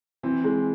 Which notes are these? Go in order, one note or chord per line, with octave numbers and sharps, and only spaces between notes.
E3 C4
E3 G#3